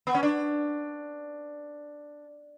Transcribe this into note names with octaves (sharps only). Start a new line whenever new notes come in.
B3
C#4
D4